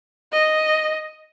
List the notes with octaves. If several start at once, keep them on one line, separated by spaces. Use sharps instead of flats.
D#5